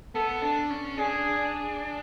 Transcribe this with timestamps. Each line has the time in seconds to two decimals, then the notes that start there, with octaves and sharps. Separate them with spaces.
0.15 B3 A4
0.42 D4
0.70 C#4
0.98 D4 G#4